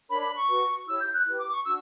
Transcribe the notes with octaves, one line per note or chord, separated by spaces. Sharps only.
D4 A#4 C#5 B5
B5
C#6
F#4 B4
E4 G4 C#5 E6
G6
F#6
E4 G4 B4
D6
C#6
D4 F#4 E6